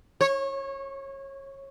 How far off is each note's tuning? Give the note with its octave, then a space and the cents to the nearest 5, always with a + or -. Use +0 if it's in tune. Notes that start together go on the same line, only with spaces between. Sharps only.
C#5 -25